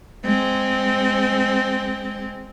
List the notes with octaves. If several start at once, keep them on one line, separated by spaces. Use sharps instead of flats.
G#3 C4